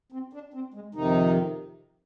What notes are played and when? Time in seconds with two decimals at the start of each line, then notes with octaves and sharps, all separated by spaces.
0.12 C4
0.33 D4
0.54 C4
0.74 G#3
0.95 F2 C3 D#3 D#4